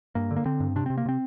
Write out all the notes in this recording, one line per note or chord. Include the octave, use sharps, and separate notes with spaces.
G2 A#3
D3
A#3
D3 C4
G2
C3 D4
C3 C4
A#3
C3 C4